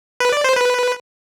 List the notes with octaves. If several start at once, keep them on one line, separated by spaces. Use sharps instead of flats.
B4
D5
C5
B4